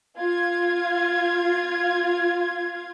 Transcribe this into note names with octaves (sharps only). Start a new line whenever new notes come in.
F4 G#6